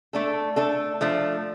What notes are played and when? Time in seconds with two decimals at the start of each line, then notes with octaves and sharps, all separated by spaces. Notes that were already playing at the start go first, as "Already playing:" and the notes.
0.13 A3 D4 A4
0.56 A3 D4 A4
1.01 F3 A3 D4